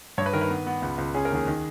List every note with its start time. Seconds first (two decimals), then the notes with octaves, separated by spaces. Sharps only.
0.18 G2 C#5
0.26 B4
0.33 D#3 A#4
0.41 B4
0.50 B3
0.67 B3
0.82 C#2
0.98 C#2
1.15 C#4 G#4
1.25 A#4
1.31 D#2 G#4
1.47 D#3